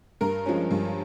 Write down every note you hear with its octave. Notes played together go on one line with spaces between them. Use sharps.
G2 A#4
F3 G#3 C#4
G2